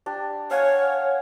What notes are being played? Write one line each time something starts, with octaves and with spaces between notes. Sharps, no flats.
D4 G4
C#5 F5 F#5 G#5